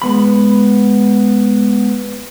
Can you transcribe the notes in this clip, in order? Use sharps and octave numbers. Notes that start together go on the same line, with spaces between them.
G#3 B3 B5